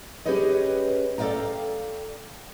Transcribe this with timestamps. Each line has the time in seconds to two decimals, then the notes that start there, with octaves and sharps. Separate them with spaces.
0.26 C#4 G4 G#4 B4 C#5 D#5
1.18 A4 D5 D#5 F5 G5 A#5